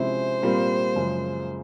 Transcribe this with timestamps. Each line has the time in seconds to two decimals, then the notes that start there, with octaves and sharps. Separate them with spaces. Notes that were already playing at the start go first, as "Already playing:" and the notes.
Already playing: C3 F3 G#3 C#4 E4 C5
0.42 A#2 G3 C4 F4 A#4
0.96 F#2 C#3 F3 G#3